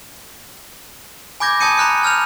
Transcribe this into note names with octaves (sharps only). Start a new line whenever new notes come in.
G#5 B5 D6 G6 G#6 A#6
A5 D#6 G6 C#7 D#7
A#5 B5 F#6 C#7
A5 F6 G6 F7